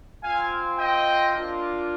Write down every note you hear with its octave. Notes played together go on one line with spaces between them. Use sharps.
C4 F4 F5 G#5
D#5 G5
A#3 D4 F4